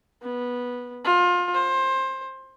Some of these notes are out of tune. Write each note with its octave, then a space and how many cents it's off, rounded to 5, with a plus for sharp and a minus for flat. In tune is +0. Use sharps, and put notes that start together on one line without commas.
B3 -10
F4 +25
C5 +20